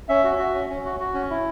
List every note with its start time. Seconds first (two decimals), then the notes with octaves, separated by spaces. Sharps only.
0.09 C#4 E5
0.24 F#4
0.39 F#4
0.55 C#4
0.70 C#4
0.85 F#4
1.00 F#4
1.14 C#4
1.30 E4